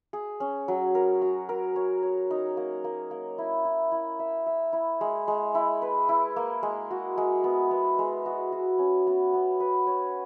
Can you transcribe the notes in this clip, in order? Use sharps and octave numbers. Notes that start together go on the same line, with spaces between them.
G#4
C#4
F#3
A#4
F#4
A#4
C#5
C#5
D#4
A#3
A#3
A#3
E4
E4
E4
E5
E5
E4
G#3
G#3
E4
B4
E4
A#3
G#3
F#4
G#3
B3
B3
G#3
F#4
F#4
C#4
B3
B3
B4
C#5